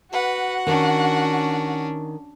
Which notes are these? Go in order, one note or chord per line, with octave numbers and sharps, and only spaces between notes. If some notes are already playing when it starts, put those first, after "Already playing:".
F#4 B4 F#5
D#3 C#4 D4